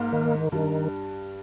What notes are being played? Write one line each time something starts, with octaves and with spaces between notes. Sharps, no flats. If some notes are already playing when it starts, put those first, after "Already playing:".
Already playing: G#2 G#3 A#3
D#3
G2 D#3 G3